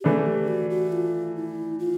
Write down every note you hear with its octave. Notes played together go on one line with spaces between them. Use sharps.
G4
E3 A3 D4 G#4
G4
F#4
F#4
F4
E4
F4